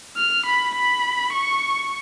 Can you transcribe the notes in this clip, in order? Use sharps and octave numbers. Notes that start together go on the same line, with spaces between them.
F6
B5
B5
C#6